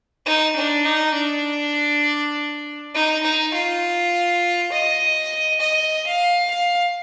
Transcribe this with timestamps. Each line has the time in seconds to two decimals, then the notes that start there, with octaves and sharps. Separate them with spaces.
0.26 D#4
0.56 D4
0.85 D#4
1.15 D4
2.94 D#4
3.23 D#4
3.54 F4
4.72 D#5
5.61 D#5
6.07 F5
6.51 F5